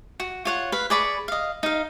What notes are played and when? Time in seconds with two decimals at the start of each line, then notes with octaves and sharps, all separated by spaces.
0.20 F#4
0.45 F4 C#5 F#5
0.72 B4 F5
0.90 G#4 D5 B5 C#6
1.28 D#5 F5
1.63 D#4 F5